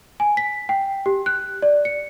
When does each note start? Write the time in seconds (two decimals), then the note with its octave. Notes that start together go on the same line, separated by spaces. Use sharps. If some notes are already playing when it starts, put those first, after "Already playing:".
0.20 G#5
0.37 B6
0.69 G5
1.06 G4
1.26 F#6
1.62 D5
1.85 C#7